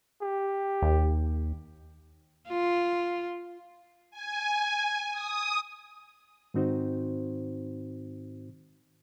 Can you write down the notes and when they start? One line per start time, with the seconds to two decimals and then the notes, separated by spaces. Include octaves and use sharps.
0.22 G4
0.82 D#2
2.49 F4
4.11 G#5
5.13 D#6
6.54 G#2 D#3 C4 D#4 F#4 C5